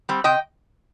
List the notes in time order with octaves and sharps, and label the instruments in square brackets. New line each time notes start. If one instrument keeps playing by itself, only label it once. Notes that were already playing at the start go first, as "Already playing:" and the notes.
[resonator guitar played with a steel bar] G3 C4
C3 D#5 G5